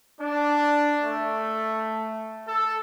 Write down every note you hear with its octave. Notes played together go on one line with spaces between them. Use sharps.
D4
A3
A4